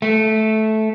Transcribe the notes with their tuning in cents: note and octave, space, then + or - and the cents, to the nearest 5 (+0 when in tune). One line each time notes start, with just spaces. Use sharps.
A3 -10